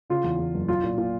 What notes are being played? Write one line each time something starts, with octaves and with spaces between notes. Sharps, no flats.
C#3 F4
E2
E2
F#1
B1 F4
A#2
A#2